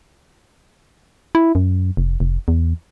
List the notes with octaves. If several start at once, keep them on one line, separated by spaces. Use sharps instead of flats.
E4
F#2
F1
F1
E2